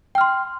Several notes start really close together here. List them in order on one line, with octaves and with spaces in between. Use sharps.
G5 F6 C6